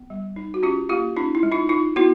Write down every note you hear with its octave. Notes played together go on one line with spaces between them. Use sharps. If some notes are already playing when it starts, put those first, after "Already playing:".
Already playing: B3
G3
D#4
F#4
C#4 F4 G4
A#3 F4 G4
C#4 D#4 F4
E4
G#3
D#4 F4
D#4 F4
B3 E4 F#4